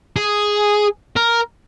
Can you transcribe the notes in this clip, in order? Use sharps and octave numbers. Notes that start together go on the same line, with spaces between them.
G#4
A#4